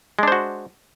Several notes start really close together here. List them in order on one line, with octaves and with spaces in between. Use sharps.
G#3 D4 C5 F#4